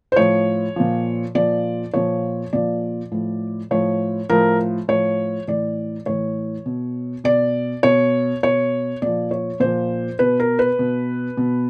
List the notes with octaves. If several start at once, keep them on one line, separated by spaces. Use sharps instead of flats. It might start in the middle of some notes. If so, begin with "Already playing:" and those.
C5
A2 F3 C#5
A#2 F3
A#2 F3 D5
A#2 F3 C#5
A#2 F3 D5
A2 F3
A2 F3 C#5
A2 F3 A#4
A2 F3 C#5
A2 E3 D5
A2 E3 C#5
B2
B2 D5
B2 C#5
B2 C#5
A#2 F3 D5
C#5
A#2 F3 C5
B2 B4
A#4
B4
B2
B2